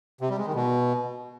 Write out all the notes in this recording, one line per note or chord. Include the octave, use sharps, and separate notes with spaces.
C3
G3
G#3
D#3
B2